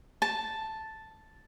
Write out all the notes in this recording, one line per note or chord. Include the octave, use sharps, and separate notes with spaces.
A5